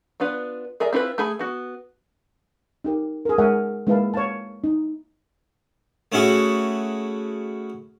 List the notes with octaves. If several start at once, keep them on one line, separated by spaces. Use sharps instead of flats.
B3 D4 F4 B4
G#4 A#4 D5 E5
C4 E4 F4 A4 B4
A3 G#4 B5
B3 F#4
D#4 G4 A#4
G#4 A#4
G#3 A#4 C#5 E5 F#5 G#5
G#3 A#3 E4 B4 F5 A5
C#5 F5 A5
D#4 E4
A3 C#4 E4 F#4 G#4